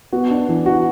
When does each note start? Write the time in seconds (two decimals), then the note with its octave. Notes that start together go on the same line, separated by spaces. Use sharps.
0.12 B3 F#4
0.31 D4
0.49 E3
0.66 F#4